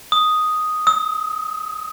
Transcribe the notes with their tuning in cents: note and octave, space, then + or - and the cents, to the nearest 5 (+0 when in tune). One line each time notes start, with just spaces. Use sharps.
D#6 +0
D#6 +45